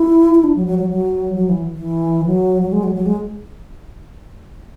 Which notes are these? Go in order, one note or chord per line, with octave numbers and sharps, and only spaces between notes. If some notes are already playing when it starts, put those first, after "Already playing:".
Already playing: E4
E4
D4
F#3
F#3
F#3
F#3
F#3
E3
E3
F#3
F#3
G#3
F#3
F#3
G#3